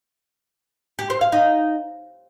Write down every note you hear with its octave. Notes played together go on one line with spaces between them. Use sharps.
G4
C5
F5
D#4